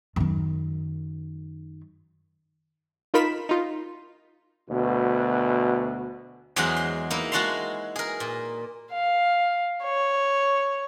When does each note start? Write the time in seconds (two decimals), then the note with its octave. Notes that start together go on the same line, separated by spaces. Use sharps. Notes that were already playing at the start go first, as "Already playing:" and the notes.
0.16 F#2 D#3
3.14 D#4 F4 A#4 B5 B6 E7
3.49 D#4 F4
4.70 D2 B2
6.56 E2 F#3 G#3 G#4 C5 F#5
6.76 C6
7.10 A#3 D#4 E4
7.32 G#3 F#4 F#5 A5 A#5 C6
7.96 G#4 A#4
8.20 A#2
8.92 F5
9.84 C#5